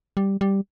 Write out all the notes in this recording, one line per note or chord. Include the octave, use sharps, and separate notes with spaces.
G3
G3